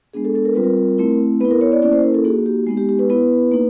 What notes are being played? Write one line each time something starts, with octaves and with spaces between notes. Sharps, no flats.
G#3 B3 D4 G#4
A4
A4
A#4
G3 C4 F4 B4
A#4
A3 C4 E4
B3 E4 B4
A#4
C#5
D5
A#3 C#4 E4 D5
C5
A#4
A4
A#3 D#4 F#4 G#4
G4
G#3 B3 D#4
G4
G4
B4
B3 E4 B4
A#3 D#4